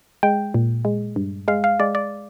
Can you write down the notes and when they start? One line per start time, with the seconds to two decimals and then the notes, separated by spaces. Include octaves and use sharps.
0.23 G#3 G5
0.54 A#2
0.85 G#3
1.16 G2
1.48 G#3 F5
1.64 F5
1.80 G#3 D5
1.95 D5